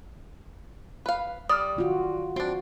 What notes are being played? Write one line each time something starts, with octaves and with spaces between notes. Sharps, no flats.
B4 F5
G3 D5 D#6 F6
D#3 F4 F#4
C4 D4 F#4